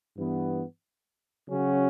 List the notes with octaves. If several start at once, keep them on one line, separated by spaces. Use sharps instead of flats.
G2 E3 B3
C#3 F#3 C#4 F#4